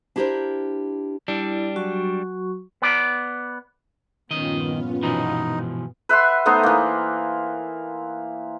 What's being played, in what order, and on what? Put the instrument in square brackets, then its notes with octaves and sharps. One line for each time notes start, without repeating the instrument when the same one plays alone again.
[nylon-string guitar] D4 E4 G4 G#4 A#4 C5
[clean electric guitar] G3 D4 [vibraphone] E4
[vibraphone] F#3 F#4 C#6
[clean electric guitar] B3 D5
[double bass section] A#1 G2 B3 [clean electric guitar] D#3 D#5 [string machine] C#4 F4
[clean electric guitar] B2 E3 F3 [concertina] D#4
[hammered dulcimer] B4 E5 F#5 C6
A3 B3 D#4 C5
E3 A#3